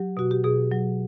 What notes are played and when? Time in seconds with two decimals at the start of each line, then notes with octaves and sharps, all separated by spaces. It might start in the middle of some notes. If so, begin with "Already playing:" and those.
Already playing: F#3 G4
0.17 B2 F#4
0.31 G4
0.44 B2 G#4
0.72 F#3